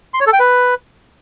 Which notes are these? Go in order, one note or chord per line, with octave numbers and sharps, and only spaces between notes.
C6
C#5
A4
G5
B4